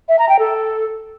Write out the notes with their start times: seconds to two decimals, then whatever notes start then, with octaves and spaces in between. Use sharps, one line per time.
0.09 E5
0.19 A#5
0.29 G5
0.39 A4